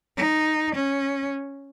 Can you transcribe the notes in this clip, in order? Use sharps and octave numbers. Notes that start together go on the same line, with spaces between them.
D#4
C#4